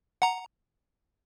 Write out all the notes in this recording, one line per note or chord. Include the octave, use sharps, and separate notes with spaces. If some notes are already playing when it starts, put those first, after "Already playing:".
F#5 A#5